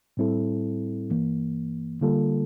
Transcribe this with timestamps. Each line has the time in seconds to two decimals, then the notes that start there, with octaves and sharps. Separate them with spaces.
0.17 A2 G3 C4 E4 A4
1.10 G2 E3 A#3
2.01 D3 G3 A#3 F4 A4